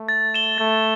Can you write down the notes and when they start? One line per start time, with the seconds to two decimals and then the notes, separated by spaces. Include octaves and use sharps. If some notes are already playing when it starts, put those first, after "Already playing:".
Already playing: A3
0.08 A6
0.34 E7 G7
0.58 A3 A6